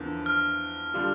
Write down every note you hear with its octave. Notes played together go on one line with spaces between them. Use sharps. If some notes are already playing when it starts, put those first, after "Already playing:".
Already playing: E2 D3 F3 A#3
F6
D3 G3 D4 F4